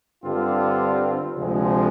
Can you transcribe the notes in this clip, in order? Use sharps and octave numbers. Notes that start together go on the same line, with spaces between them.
G2 D3 G3 C4 F4
D2 C3 F3 G#3